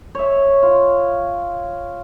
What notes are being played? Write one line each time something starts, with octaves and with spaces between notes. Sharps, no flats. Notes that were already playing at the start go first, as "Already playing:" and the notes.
C#5 E5
F4